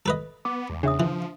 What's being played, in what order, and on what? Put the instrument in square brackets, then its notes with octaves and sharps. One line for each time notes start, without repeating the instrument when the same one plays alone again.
[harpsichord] A4 B4 D#5
[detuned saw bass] B3 [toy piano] D6
[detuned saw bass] E2
[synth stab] C#3 [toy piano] D4 E5 D#6
[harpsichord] E3 [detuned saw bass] F3